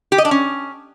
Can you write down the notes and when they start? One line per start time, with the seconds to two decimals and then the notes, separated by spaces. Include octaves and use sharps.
0.12 G4
0.18 D#5
0.25 D4
0.31 C#4